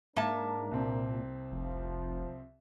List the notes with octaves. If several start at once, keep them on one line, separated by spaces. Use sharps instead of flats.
G#2 A#3 D4 A#4 E5 A5
C2 A#2 C4
F1 F3